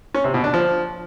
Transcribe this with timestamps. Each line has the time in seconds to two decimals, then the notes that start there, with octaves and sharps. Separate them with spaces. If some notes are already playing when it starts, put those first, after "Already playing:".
0.15 C#4
0.24 C3
0.34 B2
0.44 D4
0.54 F3